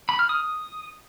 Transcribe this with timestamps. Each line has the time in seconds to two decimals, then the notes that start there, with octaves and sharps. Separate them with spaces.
0.09 B5
0.19 F6
0.29 D#6